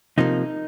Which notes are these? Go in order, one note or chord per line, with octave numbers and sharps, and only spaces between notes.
C3 F3 A#3 D#4